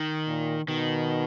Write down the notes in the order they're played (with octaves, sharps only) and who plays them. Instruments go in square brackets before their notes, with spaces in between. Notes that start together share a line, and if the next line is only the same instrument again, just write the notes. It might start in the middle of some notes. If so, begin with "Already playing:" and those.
Already playing: [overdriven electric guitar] D#3
[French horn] A#2
[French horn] B2 [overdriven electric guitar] D#3